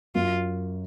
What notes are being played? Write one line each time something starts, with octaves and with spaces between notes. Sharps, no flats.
F#2 F4